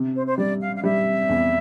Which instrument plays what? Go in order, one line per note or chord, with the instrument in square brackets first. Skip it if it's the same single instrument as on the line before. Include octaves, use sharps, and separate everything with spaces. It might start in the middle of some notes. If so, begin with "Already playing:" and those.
Already playing: [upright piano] C3
[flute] C5
C5
[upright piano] G3 [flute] D5
[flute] F5
F5
[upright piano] G3 [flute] E5
[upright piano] E2